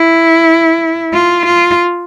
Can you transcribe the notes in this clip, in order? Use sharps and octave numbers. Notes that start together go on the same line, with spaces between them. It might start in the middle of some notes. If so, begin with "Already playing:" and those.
Already playing: E4
F4
F4